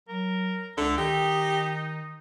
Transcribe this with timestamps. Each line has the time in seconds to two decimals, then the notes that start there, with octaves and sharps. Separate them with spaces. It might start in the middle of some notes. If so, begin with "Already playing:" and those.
0.08 F#3 A#4
0.77 C#2 D3 E5
0.98 D#3 D#4 G4